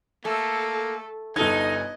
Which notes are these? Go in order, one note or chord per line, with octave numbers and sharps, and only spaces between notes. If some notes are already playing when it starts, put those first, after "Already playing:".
A3 A#3 A4
G1 D#4 A4 D#5 G#5 G#6